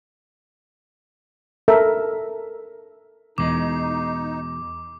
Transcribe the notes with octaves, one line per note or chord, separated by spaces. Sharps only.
A4 A#4 E5
E2 B2 E3 G#3 D#4 D6